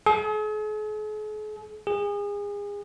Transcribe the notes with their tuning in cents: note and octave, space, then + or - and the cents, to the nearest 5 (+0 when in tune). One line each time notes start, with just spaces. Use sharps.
G#4 +45
G#4 -30